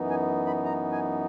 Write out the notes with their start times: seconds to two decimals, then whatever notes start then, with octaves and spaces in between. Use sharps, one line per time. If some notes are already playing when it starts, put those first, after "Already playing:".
Already playing: F#2 E3 B3 D#4
0.10 G#5
0.47 B5
0.65 A#5
0.92 G#5